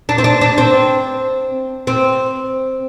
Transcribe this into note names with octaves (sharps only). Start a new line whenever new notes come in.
D4
C4
D4
D4
C4
C4